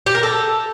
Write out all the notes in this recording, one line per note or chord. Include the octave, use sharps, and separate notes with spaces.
G4
A#4
A4